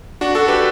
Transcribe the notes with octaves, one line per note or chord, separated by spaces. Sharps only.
D4 F#4
F#4 A4
G4 B4